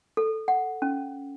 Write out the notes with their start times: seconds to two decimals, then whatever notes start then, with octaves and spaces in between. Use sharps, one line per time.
0.17 A4
0.48 F#5
0.82 C#4